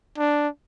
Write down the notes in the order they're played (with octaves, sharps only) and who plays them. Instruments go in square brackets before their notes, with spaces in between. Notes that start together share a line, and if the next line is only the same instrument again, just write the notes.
[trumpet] D4